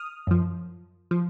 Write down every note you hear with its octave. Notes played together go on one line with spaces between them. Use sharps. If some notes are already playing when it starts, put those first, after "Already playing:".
Already playing: D#6 F6
F#2 F3
F3